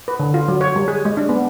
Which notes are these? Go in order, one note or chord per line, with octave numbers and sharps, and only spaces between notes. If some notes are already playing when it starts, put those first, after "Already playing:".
B4
D3
F4
F#3
C#5
G3
G#4
G#3
D4
B3